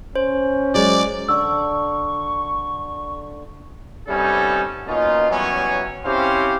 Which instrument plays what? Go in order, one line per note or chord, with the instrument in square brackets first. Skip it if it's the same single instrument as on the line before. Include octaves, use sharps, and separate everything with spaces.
[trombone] C#4 [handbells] C5
[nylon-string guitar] F#3 G#3 [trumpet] D5
[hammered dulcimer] D3 [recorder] C#6 [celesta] E6
[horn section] C3 G3 B3 C#4 D#4 A4
B2 A#3 C#4 D#4 F4
E3 F#3 G3 B3 C#4
C4 C#4 E4 G4 C5 F5